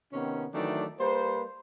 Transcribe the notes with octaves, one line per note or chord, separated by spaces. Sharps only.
C3 D#3 B3 C#4
D#3 E3 F#3 A3 D4 D5
G3 A#3 B4 C5